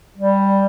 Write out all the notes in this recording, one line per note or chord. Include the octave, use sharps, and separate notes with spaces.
G3